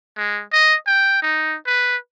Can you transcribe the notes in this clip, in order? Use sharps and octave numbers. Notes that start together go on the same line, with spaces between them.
G#3
D#5
G5
D#4
B4